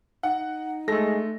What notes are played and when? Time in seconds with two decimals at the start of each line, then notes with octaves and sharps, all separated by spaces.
0.23 D#4 F#5
0.88 G#3 A3 A4 A#6